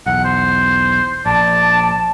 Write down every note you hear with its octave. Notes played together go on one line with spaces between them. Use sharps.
B1 E2 F#5
C5
A#1 D5 A5